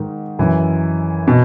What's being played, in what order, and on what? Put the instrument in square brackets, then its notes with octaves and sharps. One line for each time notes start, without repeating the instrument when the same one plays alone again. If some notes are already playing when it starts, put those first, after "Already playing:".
Already playing: [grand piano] G#2 D#3
F#2 E3
B2